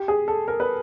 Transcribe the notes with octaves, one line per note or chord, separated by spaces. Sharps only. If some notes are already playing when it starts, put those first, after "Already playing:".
Already playing: G4
G#4
A4
A#4
B4